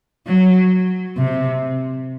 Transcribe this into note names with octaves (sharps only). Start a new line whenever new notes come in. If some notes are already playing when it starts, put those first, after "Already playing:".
F#3
C3